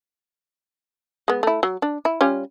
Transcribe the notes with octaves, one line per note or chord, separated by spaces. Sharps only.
G#3 B3
A3 E4
F#3
D4
E4
G3 C#4 F4